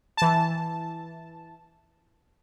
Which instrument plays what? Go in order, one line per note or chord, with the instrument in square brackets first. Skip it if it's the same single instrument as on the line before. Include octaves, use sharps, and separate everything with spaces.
[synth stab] E3 A5